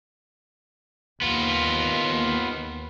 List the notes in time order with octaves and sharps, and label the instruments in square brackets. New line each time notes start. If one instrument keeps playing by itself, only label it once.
[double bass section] D#2 [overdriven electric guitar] B3 F4